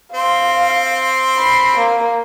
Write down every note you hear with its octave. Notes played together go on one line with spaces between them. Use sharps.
C4 F5 C6
B5
A#3